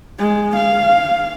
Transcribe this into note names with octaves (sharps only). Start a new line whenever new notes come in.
G#3
F5